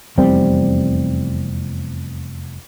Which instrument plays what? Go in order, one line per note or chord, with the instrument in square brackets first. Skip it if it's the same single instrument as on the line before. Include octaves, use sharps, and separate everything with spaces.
[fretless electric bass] F1 E2 G3 C4